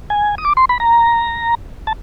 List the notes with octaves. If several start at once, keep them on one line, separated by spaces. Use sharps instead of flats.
G#5
D#6
D6
C6
B5
A#5
A5